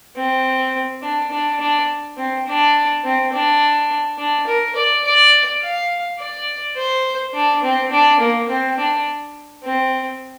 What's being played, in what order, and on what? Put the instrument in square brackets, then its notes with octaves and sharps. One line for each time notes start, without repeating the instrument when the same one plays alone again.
[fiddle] C4
D4
D4
D4
C4
D4
C4
D4
D4
A#4
D5
D5
F5
D5
C5
D4
C4
D4
A#3
C4
D4
C4